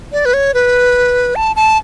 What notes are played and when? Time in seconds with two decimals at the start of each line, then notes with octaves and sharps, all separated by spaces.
0.12 D5
0.25 B4
0.34 C#5
0.54 B4
1.36 A5
1.56 A5